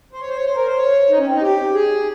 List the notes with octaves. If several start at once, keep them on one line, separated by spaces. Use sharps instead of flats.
C5
C#5
C5
C#5
C5
A#4
C5
C#5
D#4
C#4
C4
D#4
G4
G#4